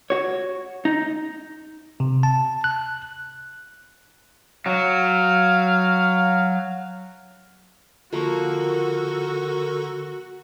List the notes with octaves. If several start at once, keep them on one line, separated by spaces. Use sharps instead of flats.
F#4 C#5
D#4
C3
A5
F#6
F#3 F5
D3 F3 A#3 F#4 A4 A#4 C#6